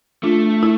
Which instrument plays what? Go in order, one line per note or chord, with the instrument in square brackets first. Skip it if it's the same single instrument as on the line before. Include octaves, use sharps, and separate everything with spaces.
[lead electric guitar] A3 [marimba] D4 F4
[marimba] E4